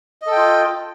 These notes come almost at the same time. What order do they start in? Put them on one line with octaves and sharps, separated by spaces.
D#5 A4 G5 F4